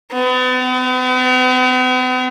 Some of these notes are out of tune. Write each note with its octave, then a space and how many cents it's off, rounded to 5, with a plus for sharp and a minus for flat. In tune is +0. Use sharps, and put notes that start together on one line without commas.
B3 +45